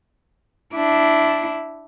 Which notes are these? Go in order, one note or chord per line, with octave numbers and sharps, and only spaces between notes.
D4 E4